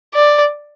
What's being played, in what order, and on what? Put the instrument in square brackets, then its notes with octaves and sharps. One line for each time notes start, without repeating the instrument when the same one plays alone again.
[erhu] D5